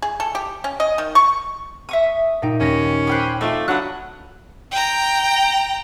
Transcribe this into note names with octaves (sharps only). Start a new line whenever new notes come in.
G#4
A4
G4
C#4
D#5
D#3
C#6
E5 C#6 D#6
A#2 D#4 G5
D#2 C#4 A#6
C5 G5 B5 D6 F6 F#6
A3 C4 D#4 F4 D5
F#3 D4 F#5 B5 D#6 F#6
G5 A#5